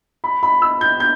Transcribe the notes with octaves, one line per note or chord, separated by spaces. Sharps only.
B5
B5
E6
G6
G6